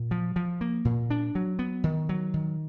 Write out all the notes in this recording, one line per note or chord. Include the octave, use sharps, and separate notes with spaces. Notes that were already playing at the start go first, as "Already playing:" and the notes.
Already playing: A#2
F3
F3
A#3
A#2
D4
F#3
B3
D#3
F#3
D#3